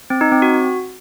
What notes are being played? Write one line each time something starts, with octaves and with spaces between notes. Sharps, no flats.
C4
D#4
C4
F#4